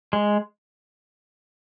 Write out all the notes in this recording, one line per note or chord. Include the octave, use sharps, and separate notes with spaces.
G#3